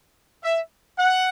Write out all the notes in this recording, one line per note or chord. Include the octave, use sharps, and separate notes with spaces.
E5
F#5